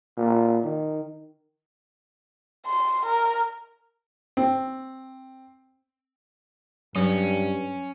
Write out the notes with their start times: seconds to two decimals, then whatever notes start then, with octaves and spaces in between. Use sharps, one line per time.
0.17 A#2
0.64 D#3
2.66 C6
3.06 A#4
4.37 C4
6.96 G2 F#3 C#4